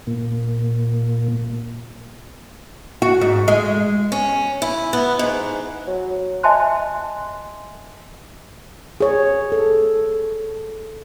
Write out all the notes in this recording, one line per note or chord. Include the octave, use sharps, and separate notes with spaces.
A#2
F#4
G#2
G#3
C#4
E4
B3
G#2
F#3
D#5 E5 G#5 A5 C6 F#6
G#4 C#5
A4